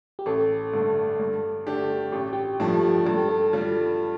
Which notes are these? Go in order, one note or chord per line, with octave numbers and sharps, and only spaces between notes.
G4
A1 A4
G2 D3 A3
G2
D3 A3 D4 G4
A1 G4
G4
G2 F3 A3 D4
G2 A4
G4
A4
G3 F4